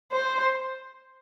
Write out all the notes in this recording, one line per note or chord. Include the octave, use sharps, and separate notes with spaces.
C5